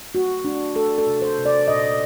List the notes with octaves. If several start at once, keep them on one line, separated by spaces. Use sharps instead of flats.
A3 F#4
A3 D4
A3 A4
A4
C3
C5
C3
D5
A#2 D#5